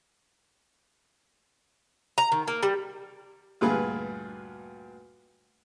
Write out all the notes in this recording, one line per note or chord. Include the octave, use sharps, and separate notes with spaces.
A#5
D#3
A#3
G3
D2 G2 A#2 G#4 B4 F5